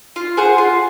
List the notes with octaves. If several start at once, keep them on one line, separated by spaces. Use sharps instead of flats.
F4
G#4 C5 F#5
F4